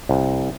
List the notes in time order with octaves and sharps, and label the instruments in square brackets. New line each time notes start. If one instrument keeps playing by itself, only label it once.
[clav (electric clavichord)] C2